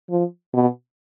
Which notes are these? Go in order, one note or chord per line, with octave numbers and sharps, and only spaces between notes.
F3
B2